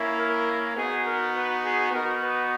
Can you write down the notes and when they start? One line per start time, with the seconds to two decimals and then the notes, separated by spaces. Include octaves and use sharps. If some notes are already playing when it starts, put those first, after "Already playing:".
Already playing: A#3 C#4 E4
0.18 A#4
0.76 B3 D#4 F#4 G#4
1.05 A#4
1.34 B4
1.63 G#4
1.92 B3 D#4 F#4 A#4
2.21 B4